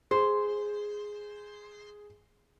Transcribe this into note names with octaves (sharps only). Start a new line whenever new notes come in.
G#4 C5